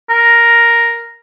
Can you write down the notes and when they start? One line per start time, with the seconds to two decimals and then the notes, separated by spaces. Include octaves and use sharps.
0.10 A#4